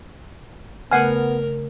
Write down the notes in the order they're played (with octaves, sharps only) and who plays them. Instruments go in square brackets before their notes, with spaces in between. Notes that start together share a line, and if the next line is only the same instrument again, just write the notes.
[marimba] C#3 A3 G#6 [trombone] B3 [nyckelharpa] A#4 [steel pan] F#5 G#5